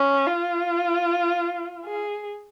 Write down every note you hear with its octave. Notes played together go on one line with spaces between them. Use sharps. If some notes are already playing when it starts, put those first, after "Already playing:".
Already playing: C#4
F4
G#4